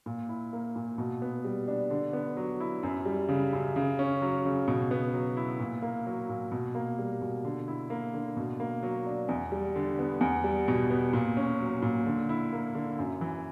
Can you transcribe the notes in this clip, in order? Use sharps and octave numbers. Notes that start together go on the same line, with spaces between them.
A#2
E4
A#3
A#2
B2
B3
G3
D4
D3
B3
F#3
E4
F#2
G3
C#3
F#2
C#3
C#4
F#3
C#3
B2
B3
F#3
E4
A#2
A#3
F#3
A#2
B2
A#3
G3
B2
D3
E4
A#3
D3
B2
A#3
F#3
D4
E2
G3
D3
B3
E2
G3
B2
B3
A#2
C#4
F#3
A#2
D3
E4
A#3
D3
F#2
E3